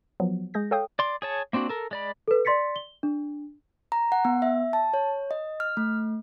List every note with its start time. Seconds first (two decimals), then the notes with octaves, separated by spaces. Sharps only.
0.20 F3 F#3 B3
0.54 G#3 G#4 G6 A#6
0.71 A4 C#5 F5 G5 D#6 G6
0.99 D5 C6
1.22 G#4 C#5 A5
1.53 A#3 C4 D4 F#4
1.69 A4 A#4
1.91 G#3 D5 B5
2.28 A4 B4
2.45 D5 C6 A6 B6 C#7
2.76 G7
3.03 D4
3.92 A#5
4.12 F#5
4.25 B3
4.42 E5
4.73 A5
4.94 C#5
5.31 D#5
5.60 F6
5.77 A3